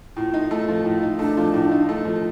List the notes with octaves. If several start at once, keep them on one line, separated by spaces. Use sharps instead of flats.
A2 F4
D#4
A3
F3
A2
D#4
A3 D4
F3
A2
D#4
A3
F3